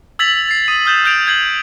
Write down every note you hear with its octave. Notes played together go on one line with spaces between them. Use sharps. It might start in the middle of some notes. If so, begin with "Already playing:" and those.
E6 G#6 A6 B6 F7 F#7
A6 C7
D#6 D#7
D#6 F6 G6 A6 E7
E6 F6 G6 A#6 D7 F7
G6 G#6 C7 F#7